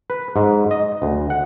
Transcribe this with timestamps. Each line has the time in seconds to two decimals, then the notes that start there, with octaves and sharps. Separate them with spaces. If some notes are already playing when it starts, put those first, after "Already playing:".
0.10 B4
0.36 G#2
0.71 D#5
1.02 D2
1.30 F#5